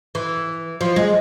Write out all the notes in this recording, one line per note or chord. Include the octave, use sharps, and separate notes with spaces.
E3
F3
G#3